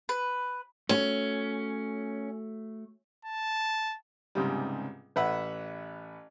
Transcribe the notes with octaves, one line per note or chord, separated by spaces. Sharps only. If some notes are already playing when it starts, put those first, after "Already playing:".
B4
A3 C#4 F#4
A5
C#2 G#2 C3 G3
A1 B4 E5 F#5 B5 E6